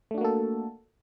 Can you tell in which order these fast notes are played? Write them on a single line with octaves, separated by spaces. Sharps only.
A3 D4 F#4 A#3 A4